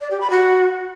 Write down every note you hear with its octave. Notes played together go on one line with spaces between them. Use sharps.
D5
G4
B5
F#4